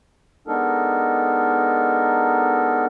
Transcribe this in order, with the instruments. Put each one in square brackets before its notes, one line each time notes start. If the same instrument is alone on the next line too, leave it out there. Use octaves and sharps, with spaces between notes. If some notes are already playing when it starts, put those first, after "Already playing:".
[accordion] G#3 B3 D4 D#4 A4 A#4